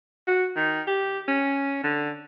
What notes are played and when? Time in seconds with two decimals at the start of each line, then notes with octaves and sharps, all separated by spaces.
0.27 F#4
0.57 D#3
0.87 G4
1.28 C#4
1.84 D3